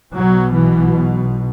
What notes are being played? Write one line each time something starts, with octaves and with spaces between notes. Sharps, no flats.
B1 B2 F#3
E3